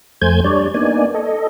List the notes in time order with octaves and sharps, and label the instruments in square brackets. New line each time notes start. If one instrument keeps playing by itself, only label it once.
[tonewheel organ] F2 A3 C5 G#5 G6 G#6
G3 D4 C#5 D5
A#3 B3 D4 D#4 D5 G#5
A4 D#5